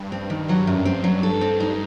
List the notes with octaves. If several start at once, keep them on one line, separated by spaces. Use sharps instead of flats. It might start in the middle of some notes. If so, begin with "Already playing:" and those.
Already playing: G2
C4
D#3
G2 F#3
F#2
C4
F#3
A4
C4
D#4